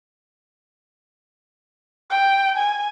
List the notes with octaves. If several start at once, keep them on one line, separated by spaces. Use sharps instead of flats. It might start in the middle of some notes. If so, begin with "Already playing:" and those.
G5
G#5